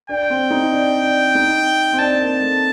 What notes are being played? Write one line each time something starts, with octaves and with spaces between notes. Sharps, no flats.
D4 G5
C4
D#4
D4
D4
D#4
C4
D4 A5
C4
A#3
A3